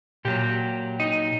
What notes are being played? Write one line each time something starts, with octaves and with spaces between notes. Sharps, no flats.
A#2 F#3 G4
D#4